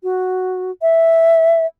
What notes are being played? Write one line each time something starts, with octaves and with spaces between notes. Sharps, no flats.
F#4
E5